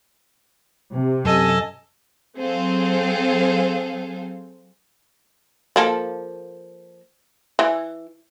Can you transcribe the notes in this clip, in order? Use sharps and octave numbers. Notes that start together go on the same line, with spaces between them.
C3
F#2 A4 D#5 G#5
F#3 C4 G#4 A4 C5 F5
F3 A#3 A4
E3